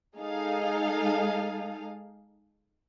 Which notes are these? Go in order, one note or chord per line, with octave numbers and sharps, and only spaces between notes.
G#3 D#4 G#4 A4 D#5 F5